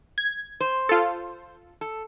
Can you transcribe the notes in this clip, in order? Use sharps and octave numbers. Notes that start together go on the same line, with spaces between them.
G#6
C5
F4 A4
A4